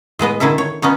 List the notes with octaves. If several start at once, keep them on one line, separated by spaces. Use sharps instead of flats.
A2 G#3 B3 D#5
D3 D#3 E4 A4 E5
C#5
B3 C#4 D#4 C#5